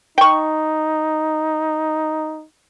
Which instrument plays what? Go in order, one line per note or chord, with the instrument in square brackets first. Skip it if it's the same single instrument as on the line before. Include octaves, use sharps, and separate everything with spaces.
[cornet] D#4 [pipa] G5 C#6